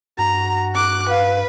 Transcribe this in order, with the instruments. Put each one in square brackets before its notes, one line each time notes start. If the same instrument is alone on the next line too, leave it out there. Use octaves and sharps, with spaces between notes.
[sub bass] G2 [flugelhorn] F#4 [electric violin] A#5
[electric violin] D6 F#6
[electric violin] B4 [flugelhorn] F5